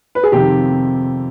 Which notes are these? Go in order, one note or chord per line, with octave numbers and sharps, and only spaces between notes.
B4
G#4
F2 C3 D#3 G4